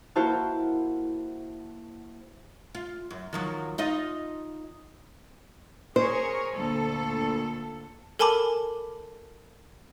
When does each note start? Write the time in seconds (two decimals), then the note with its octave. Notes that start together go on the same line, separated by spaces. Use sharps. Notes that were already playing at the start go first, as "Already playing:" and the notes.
0.16 A#3 E4 F#4 C5 A5 F6
2.75 F4
3.11 F#2
3.33 D#3 F3 F#3
3.78 D#4 F4 D#5
5.96 G#4 A#4 C5 C#5
6.53 D2 A#2 A4
8.19 A4 A#4 G#5 A5 B5 D6